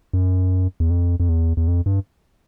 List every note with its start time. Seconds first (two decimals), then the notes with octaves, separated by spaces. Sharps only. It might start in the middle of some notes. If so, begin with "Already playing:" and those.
0.13 F#2
0.80 E2
0.90 F2
1.20 F2
1.29 E2
1.57 E2
1.68 F2
1.86 G2